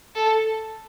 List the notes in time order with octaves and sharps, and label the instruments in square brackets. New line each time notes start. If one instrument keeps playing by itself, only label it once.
[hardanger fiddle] A4